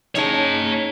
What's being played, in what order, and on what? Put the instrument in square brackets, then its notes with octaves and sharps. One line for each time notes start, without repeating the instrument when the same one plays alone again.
[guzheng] C#4 D#4 G#4 [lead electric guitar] C#5 A5